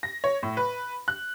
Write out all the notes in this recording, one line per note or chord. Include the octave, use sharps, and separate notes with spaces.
A#6
C#5
A2
B4
F#6